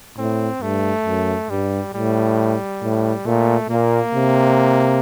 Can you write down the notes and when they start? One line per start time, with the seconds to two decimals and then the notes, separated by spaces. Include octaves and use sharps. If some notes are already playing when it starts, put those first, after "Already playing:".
0.18 A2 C4
0.62 G2 A3
1.06 F#2
1.50 G2 G3
1.94 A2 G3
2.82 A2
3.26 A#2 A3
3.70 A#2 A#3
4.15 C3